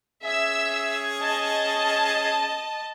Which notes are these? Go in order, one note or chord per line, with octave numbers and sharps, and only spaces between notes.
C#4 G#4 E5 E6
D#5 A5